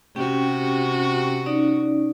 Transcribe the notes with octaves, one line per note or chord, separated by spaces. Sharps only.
C3 C#4 F#4 G4 G5
C#4 D#4 D5